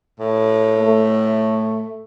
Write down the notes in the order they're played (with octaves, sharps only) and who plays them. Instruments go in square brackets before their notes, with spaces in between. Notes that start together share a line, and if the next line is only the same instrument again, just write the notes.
[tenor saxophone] A2
[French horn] A3